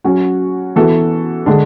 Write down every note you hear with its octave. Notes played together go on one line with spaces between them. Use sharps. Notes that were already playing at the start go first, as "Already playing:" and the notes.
F#3 C#4 F#4
E3 B3 F#4 A4
D3 G#3 D4